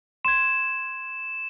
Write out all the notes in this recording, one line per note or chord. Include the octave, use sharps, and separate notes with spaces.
C6 G#6 E7